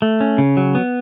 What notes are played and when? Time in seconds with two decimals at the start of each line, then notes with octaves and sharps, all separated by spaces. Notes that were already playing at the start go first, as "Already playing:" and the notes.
0.02 A3
0.21 C#4
0.38 C#3
0.57 F#3
0.75 B3